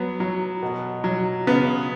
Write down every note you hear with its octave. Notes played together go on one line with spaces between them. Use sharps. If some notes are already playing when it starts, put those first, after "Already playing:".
Already playing: F#3 B3
F#3
B2
F#3
C#3 B3